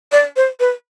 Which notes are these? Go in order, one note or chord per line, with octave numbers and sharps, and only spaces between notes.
D5
C5
B4